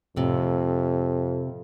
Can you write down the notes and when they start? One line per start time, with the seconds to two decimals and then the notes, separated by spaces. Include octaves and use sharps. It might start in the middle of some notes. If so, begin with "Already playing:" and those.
0.16 F2 A2 C3